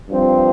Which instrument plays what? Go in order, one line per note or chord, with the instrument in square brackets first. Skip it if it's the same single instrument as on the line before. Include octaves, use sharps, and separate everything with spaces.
[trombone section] G2 F3 C4